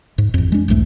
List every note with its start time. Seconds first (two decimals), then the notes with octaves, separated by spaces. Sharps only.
0.18 G#2
0.34 A1 F2
0.52 G#3 D4
0.68 B1 E2 G#2 A3